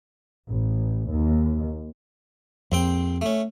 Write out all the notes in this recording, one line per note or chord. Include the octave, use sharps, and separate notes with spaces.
A1
D#2
A#1 F2 C4 G5
A3 C#4